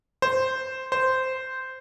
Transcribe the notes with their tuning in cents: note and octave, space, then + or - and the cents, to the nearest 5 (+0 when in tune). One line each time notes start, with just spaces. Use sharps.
C5 -5
C5 -10